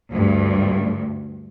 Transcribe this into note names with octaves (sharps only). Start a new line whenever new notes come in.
D2 G2